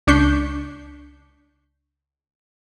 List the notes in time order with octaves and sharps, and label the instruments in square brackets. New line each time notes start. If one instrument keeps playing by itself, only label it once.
[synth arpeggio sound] C#2 D4 C#6 G6 B6 C7